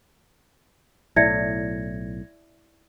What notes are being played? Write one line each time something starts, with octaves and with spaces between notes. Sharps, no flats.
B1 A2 E4 D5 E5 G#6 A#6 C#7